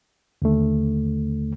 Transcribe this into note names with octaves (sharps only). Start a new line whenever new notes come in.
D#2 D3 A3